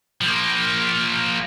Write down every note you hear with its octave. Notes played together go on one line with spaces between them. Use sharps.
F3 A#3